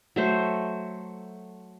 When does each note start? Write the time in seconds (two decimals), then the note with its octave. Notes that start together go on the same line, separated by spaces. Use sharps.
0.16 F#3 A3 C5